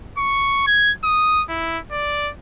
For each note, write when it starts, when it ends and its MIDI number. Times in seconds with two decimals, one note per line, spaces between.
0.18 0.65 85
0.67 0.92 92
1.04 1.43 87
1.49 1.78 64
1.91 2.31 74